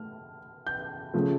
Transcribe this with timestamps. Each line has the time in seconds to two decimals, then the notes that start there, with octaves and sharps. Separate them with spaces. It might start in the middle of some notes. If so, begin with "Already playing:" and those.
Already playing: A3 F6
0.67 G6
1.14 C#3 F3 A3